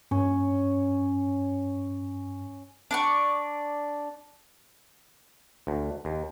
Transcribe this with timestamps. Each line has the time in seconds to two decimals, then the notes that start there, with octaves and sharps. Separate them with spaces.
0.11 G2 C#4 C#5
2.91 D4 D5 C#6
5.67 D2
6.05 D#2